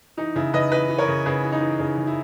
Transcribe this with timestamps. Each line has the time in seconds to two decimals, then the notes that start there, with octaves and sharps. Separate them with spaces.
0.17 E3 D#4
0.36 C#3 E4
0.54 C#3 B4 D#5
0.72 E3 B4 D#5
0.90 E3
0.98 A#4 C#5
1.08 C#3
1.26 C#3 G#4 B4
1.44 E3
1.52 D#4
1.62 E3
1.79 C#3
1.98 C#3
2.07 E4